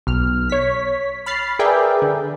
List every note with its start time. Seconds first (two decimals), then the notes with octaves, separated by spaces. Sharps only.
0.07 B1 F6
0.49 C#5 B6
1.26 B5 F6 A6 C7
1.59 G#4 A#4 B4 D5 E5 G5
2.02 D3